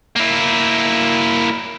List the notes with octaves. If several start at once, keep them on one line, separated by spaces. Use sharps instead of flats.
A#3 E4